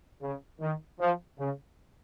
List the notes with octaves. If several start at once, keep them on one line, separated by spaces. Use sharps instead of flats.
C#3
D#3
F3
C#3